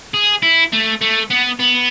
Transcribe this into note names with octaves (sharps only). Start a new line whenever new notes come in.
G#4
E4
A3
A3
B3
B3